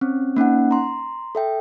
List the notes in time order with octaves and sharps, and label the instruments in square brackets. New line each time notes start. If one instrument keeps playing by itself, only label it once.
[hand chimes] C4 C#4
A#3 C#4 D#4 F#5
A#5 C6
A4 E5 G5